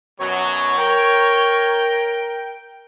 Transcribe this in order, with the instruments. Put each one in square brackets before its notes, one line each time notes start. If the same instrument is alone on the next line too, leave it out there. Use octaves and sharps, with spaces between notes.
[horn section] F#2 B2 F#3 [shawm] C#5
[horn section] A#4 G5